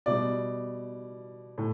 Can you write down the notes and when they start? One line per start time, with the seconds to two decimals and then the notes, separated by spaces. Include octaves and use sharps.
0.06 B2 G3 D5
1.58 A2